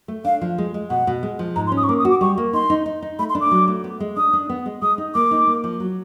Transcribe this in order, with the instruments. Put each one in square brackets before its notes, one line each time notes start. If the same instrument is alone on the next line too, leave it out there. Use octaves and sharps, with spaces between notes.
[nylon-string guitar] A3
[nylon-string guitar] D4 [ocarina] F5
[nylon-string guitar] F3
G#3
G#3
[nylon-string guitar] B2 [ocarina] F#5
[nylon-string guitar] B2
G#3
F3
[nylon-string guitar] G#2 [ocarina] A#5
[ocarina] C6
[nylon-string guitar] C#4
[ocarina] D#6
C#6
[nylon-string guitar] A#3 [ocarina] D6
[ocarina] D#6
[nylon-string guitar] F#4
[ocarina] D6
[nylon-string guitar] G3 [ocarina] C#6
[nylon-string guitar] A#3
[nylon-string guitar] D#4 [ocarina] C6
[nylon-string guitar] D#4
D#4
D#4
[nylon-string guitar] A3 [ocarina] B5
[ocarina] C6
[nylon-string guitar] D4
[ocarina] D6
[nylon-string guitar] F#3
A3
B3
G#3
[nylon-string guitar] D4 [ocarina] D#6
[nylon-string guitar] D4
B3
G#3
[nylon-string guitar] G#3 [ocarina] D#6
[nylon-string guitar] D#4
[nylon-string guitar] A#3 [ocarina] D6
[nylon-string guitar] D#4
A#3
F3
F#3